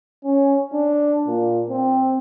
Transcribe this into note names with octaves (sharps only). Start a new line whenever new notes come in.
C#4
D4
A#2
C4